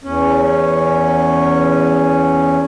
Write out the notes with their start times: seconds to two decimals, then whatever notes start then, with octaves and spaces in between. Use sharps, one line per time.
0.04 E2 C#4